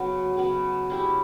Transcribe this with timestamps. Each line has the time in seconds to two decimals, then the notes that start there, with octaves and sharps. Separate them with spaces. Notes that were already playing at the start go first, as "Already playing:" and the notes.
Already playing: C#3 F#3 B3
0.37 C#3 F#3 B3
0.90 G#3 C#4 E4 G4